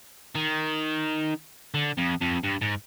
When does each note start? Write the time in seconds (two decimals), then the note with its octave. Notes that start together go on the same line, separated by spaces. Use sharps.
0.35 D#3
1.74 D3
1.98 F2
2.21 F2
2.44 G2
2.61 G#2